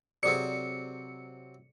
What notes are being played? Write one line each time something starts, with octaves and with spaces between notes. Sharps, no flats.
C3 F#3 C4 G#4 A4 D5 C#7